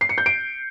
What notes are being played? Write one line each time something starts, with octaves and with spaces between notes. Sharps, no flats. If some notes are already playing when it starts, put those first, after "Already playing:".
C7
C#7
G6
D7